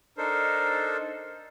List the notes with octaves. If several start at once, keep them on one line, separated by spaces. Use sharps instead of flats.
D4 D#4 A4 A#4 C5